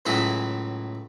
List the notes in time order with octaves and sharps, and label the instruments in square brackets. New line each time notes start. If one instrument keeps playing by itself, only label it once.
[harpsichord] C#2 A2 E3 F#3 E4 G#4